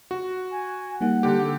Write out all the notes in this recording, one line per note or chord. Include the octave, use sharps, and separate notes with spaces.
F#4
G#5
G3 A#3 D#4 F#5
D3 G4
A4